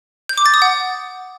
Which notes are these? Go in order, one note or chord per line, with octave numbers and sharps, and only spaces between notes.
G6
D6
A6
D#6
F#5